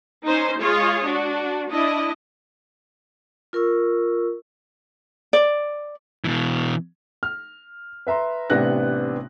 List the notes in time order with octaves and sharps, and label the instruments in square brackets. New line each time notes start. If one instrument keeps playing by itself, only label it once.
[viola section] C#4 D#4 C5
G#3 F4 G#4 C#5 D#5
D4 F#4
D4 E4 D#5
[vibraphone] F4 A#4 C#6 E6
[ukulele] D5
[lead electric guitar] B2 E3
[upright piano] F6
B4 E5 A#5 C6
A1 C3 B3 D4 F#6 A#6